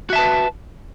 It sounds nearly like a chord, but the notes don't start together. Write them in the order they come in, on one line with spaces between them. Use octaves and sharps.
F#4 E5 A5 B4